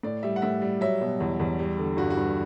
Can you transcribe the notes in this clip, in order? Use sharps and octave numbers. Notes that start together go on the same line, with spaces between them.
A2 D5
G3 E5
F#5
A2 E5
G3
F#3 E5
B2
E2
E2
G3
D3
G2 F#4
F#4
G2